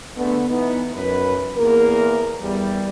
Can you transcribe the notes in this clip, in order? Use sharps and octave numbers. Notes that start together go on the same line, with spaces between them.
D3 G#3 A3 B3
E3 B3 D#4
F#2 B4
E2 A#3 A#4
E2 G3